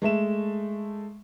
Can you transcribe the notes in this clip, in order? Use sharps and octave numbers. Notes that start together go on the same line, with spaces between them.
G#3 A3 E5 E7